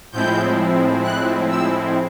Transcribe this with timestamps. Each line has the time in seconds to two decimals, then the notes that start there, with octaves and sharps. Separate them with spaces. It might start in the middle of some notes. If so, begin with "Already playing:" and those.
0.12 A2 F3 G#3 C4 E4 G6
1.04 F#6
1.49 E6